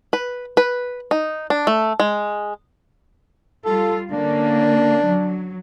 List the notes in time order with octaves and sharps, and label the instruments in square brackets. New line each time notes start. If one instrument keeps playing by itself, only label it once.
[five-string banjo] B4
B4
D#4
D4
A3
G#3
[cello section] G3 F4 [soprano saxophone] A4
[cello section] D3 A#3 C#4 [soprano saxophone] D4
[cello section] F#3